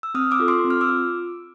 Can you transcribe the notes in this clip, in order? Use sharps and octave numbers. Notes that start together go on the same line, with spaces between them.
E6
C4 D#6 F6
D6 E6
F4 A4
C6 D6
C4
F6
D6 E6
F4